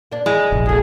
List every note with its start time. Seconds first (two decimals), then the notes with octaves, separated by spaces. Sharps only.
0.12 A#3 D4
0.26 G#3 E4
0.52 F1 A#1
0.66 B2 A3 G#4